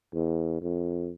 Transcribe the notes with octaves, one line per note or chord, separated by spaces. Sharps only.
E2
F2